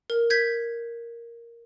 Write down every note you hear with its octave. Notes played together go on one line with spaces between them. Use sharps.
A#4
G6 G#6 B6